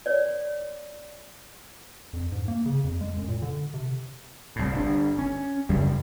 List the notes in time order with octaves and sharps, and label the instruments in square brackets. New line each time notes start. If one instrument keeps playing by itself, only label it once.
[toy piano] C#5 D5
[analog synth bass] F2
G#2
A#3
C#3
F2
G#3
F#2
A#2
D3
C3
[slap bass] C2 A2
G1 B2 D4
C#4
F#2 C#3 G3